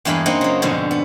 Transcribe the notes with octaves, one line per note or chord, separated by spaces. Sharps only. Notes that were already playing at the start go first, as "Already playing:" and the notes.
E2 G2 G#3 A#3 D#5 B5
F#2 A#3 C4 D#4 D#5 F#5
C#3 F#3
F2 G#2 B2 D3 F3
B3